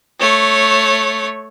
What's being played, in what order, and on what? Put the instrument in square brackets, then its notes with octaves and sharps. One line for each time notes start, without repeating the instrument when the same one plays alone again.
[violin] A3 C#5